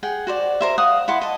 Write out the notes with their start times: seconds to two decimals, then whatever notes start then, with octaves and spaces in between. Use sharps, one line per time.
0.03 G#4 F#5 G5
0.27 F#4 C5 D5
0.61 A#4 C5 E5
0.78 F5 F#5 D#6
1.08 E4 F#5 C6 D6
1.21 D#5 A5